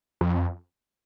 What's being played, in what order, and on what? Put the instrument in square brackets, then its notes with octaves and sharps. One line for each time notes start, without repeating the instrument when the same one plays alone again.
[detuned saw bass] F2